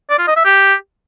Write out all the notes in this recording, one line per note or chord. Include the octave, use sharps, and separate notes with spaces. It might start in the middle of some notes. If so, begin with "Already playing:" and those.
D5
F4
D#5
E5
G4